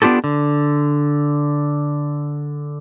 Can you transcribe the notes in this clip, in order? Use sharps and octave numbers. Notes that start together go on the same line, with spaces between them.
B3 D4 F4 G4 A4
D3